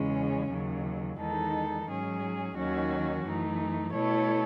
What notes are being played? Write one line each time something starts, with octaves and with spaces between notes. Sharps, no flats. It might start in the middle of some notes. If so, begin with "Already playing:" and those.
Already playing: E2 C#3 G#3 C#4
D#2 C#3 F#3
E2 D#3 G#3 D#4 A4
G#2 F#3 C#4 G#4
D#2 D#3 F#3 C#4 F#4
F#2 E3 A3 D#4
B2 A3 E4 A4 C#5